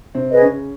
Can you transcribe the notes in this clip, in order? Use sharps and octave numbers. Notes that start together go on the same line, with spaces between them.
C3 C4
G#4 B4 D#5
C#3 C#4